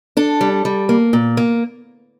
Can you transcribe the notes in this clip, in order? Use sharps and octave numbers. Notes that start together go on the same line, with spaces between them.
D4 A4
G3
G3
A#3
A#2
A#3